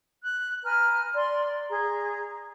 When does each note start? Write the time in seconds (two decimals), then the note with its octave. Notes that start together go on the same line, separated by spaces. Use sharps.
0.25 F#6
0.64 B4 G#5 A#5 F6
1.16 D5 C6
1.69 G#4 A#5